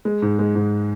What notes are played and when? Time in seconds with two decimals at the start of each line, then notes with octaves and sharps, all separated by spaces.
0.05 G#3
0.22 G#2
0.39 G#3
0.55 G#2